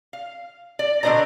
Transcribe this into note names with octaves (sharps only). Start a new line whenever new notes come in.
F5
D5
B2 D3 D4 C5 D#5 A#5